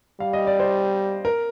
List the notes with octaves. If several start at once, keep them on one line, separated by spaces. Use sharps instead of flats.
G3 F5
D#5
D5
C5
A#4